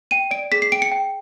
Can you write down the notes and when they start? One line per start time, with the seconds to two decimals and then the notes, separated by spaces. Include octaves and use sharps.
0.11 G5 D#7
0.31 D5 D7
0.52 G#4 B6
0.62 C7
0.72 G5 D7
0.82 C#7
0.91 G5